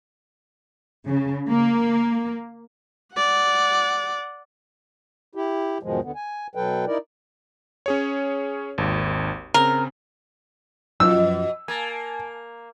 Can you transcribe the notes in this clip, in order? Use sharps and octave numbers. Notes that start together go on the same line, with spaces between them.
C#3
A#3
D5 F#5
E4 G4
E2 G#2 B2 D#3 F3 G#3
D2 D3 B3
G#5
B2 F#3 A4 B4 G5
D#4 E4 A#4 D5
C#4 G#4 C#5
G#1 D#2
C#3 C4 A#4
F#2 B2 F3 E6
A#3 G#5 A5